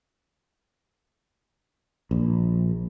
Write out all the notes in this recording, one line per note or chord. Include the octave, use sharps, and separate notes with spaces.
A#1